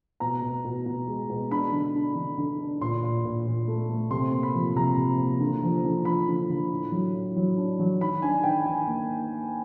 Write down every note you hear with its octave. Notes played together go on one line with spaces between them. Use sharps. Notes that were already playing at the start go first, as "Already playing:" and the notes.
B2 A#5
B2
B2
B2
G#3
B2
D4 B5
D3
D4
D3
D3
D4
A#2 C6
A#2
A#2
A#2
A3
A3
C3 C6
A#3
B5
F3
C3 A#5
C3
A#3
D3
F3
D3
F3 B5
D3
D3
A2
F#3
A2
F#3
D4
F#3
D#3 B5
D4 G#5
D#3 G5
D#3 G#5
A#3